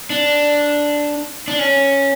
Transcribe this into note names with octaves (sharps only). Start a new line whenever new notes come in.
D4
D4
C#4